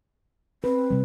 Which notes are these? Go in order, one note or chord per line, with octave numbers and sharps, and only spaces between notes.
C4 B4
C3 G3